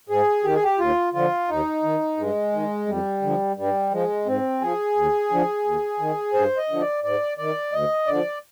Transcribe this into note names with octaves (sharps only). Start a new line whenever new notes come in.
G#2 G#4
D#3 G4
G#4
G4
D#2 F4
D3 F3 F4
D#2 D#4
D#3
G2 G#3
D#3
F2 G3
D3 F3
G2 G3
F3 G#3
G#2 C4
F3 G#4
D#2
D3 F3
D#2
D#3
G2 C5
D#5
D3 F3
D5
G#2 D5
D#3 D5
D2 D#5
D3 F3 D5